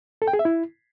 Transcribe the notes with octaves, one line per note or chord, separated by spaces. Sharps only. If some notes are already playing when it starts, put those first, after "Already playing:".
A4
G5
G#4
E5
E4